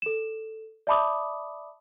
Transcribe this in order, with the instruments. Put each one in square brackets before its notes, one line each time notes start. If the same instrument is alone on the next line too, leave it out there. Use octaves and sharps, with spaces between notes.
[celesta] A4 E7
D5 E5 A5 B5 D6 D#6